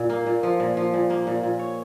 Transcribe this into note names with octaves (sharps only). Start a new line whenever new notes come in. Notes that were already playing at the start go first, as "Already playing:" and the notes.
Already playing: A#2
A#3
A#2
F3
A#2
F3
A#2
A#3
A#2
A#2
C#5